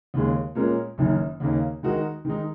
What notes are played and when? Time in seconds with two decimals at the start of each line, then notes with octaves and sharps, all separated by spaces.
0.14 D#2 C#3 G#3
0.55 A#2 G#3 C#4 A#4
0.98 F#1 F#2 D#3
1.40 D#2 C#3 A#3 D#4
1.83 D#3 G#3 D#4 F#4 A#4
2.25 D#3 G#3 D#4